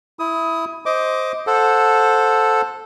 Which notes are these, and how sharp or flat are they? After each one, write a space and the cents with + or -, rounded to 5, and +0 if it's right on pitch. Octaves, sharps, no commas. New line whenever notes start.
E4 +0 D#6 +20
C5 +0 D#5 +15 D6 +0
A4 +0 C5 +5 F#5 -25